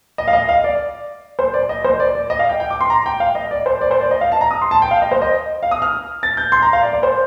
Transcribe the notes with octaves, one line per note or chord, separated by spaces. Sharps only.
D#5
F5
D#5
F5
D5
C5
D5
D#5
C5
D5
D5
D#5
F5
G5
G5
D6
C6
A#5
G5
F5
D#5
D5
C5
D5
C5
D5
D#5
F5
A5
A#5
D#6
C6
A5
G5
F5
D#5
C5
D#5
F5
D#6
F6
A6
G6
C6
A#5
F5
D5
D5
C5